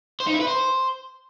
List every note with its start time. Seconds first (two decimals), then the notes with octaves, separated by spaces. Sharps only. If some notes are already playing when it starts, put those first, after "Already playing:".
0.20 C5
0.27 D#4
0.34 E4
0.41 B4
0.47 C5